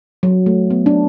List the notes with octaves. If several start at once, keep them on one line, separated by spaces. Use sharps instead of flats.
F#3
A3
B3
D4